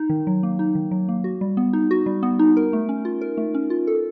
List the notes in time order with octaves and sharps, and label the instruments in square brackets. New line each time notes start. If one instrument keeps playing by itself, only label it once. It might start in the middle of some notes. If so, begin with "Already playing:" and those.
Already playing: [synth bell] D#4
D#3
F#3
A#3
D#4
D#3
F#3
A#3
F#4
G3
B3
D#4
F#4
G3
B3
D#4
A#4
A3
C#4
F4
A#4
A3
C#4
F4
A4